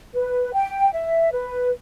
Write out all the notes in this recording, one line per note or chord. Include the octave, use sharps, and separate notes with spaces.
B4
G5
E5
B4